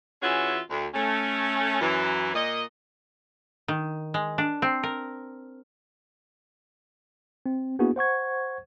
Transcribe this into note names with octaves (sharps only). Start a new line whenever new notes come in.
E3 C#4 F4 F#4 G#4 E5
D2
A3 C#4
F#2 E3
A#2 D#5
D#3
G#3
D4
C4
A#4
C4
A#3 B3 D4 E4 F#4 G#4
C5 F#5 C#6 G#6